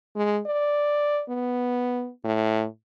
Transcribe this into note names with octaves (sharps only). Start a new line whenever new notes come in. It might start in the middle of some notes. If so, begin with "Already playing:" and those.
G#3
D5
B3
A2